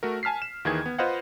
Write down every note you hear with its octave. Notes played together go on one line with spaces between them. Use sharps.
A3 F#4 A#4
G#5 A5 F6 B6 C7
E7
D#2 D#3 E3 G#4 G#6
B3
F4 B4 C5 D#5 F5 F#5